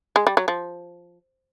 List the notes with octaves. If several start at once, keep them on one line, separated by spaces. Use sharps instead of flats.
G#3
G3
F#3
F3